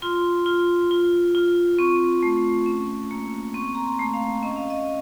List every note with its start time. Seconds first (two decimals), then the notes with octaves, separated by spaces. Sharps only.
0.02 F4 C6
0.46 F4
0.91 F4
1.35 F4
1.78 C4 C#6
2.23 A3
2.66 C#4
3.11 A#3
3.54 C4 C#6
3.75 A#5
3.84 C6
3.99 A3
4.13 F5
4.43 C#4 D#5
4.56 F5
4.70 D#5